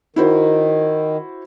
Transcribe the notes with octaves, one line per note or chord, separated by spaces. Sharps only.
D#3 E4 F#4 C5